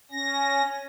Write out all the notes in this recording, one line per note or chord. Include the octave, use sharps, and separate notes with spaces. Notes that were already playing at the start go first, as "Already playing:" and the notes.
C#4 A#6